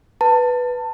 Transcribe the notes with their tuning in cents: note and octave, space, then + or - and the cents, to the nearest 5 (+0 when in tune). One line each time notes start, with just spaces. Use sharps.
B4 +0 A5 +25